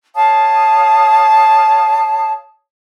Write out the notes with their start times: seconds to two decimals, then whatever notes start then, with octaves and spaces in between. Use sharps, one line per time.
0.15 C#5 F5 A5 D#6